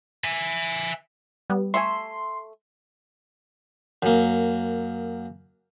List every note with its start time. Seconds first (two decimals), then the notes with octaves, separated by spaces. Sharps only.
0.24 E5 G#5
1.50 G3 B3
1.74 A3 E5 G#5 C6 C#6
4.02 F#2 A#3